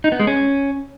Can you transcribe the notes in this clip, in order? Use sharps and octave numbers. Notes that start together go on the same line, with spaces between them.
D#4
B3
G#3
C#4